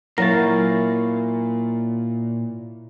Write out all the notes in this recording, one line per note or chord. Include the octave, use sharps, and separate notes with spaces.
A#2 F#3 E4 A#4 C#5 F5 A6 A#6